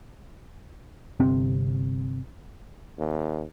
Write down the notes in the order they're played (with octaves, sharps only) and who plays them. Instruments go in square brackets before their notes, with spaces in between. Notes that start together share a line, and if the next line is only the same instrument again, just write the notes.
[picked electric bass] G1 C3 C4
[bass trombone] D#2